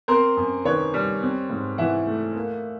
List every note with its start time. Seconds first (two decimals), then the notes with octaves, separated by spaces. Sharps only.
0.08 C4 A#4 C5
0.37 F#2
0.65 D#3 B4 C#5
0.94 G3
1.22 C4
1.50 G#2
1.78 E3 E5 F#5
2.06 A3
2.36 A#3